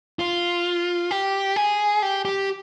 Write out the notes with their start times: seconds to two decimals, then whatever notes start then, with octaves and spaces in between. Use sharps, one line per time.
0.19 F4
1.11 G4
1.56 G#4
2.02 G4
2.25 G4